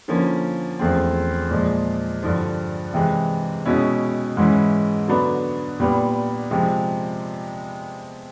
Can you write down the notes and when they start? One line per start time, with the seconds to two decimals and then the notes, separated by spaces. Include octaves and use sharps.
0.08 D3 F3 A#3 C#4
0.79 E2 C#3 F3 A3 C4
1.51 A#2 F3 G#3
2.23 G2 D3 F3
2.94 C3 E3 G#3
3.66 B2 G#3 C#4 E4
4.37 G#2 E3 G#3 C#4 E4
5.08 D3 F#3 B3 D4
5.80 A#2 G3 B3
6.51 C3 F3 G#3